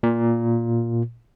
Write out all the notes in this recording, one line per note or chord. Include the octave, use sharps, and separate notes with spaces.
A#2